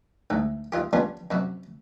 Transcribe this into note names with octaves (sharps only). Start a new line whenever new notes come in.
D2 G#2
D#2 F4 G4
B3 C#4 D4 F4 G4
F#2 C3 F#4